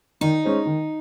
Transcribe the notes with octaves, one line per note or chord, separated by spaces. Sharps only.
D#3 D#4
G#3 C#4 G#4 C5
D#3